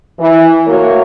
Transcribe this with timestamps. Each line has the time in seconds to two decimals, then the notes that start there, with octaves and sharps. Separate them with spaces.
0.20 E3
0.67 A3 A#3 F#4 A#4 C#5